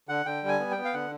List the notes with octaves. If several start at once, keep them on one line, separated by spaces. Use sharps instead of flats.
D3 F#5
D3 G5
G3
G#5
B3
G5
B3
F5
D3 F#5